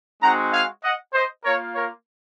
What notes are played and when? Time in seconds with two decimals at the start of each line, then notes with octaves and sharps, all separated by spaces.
0.21 G#3 C4 D#4 F#4 F#5 A#5
0.52 F5 G#5
0.83 D#5 F#5
1.13 C5 D#5
1.44 A#3 F4 A#4 C#5
1.75 A#4 C#5